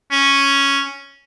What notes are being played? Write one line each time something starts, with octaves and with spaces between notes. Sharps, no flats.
C#4